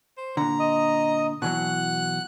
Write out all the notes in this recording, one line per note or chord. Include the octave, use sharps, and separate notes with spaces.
C5
A#2 D3 A#5
D#5
B2 E3 F#3 F#5 F#6